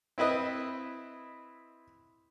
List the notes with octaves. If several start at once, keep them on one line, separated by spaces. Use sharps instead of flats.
C4 E4 B4 D#5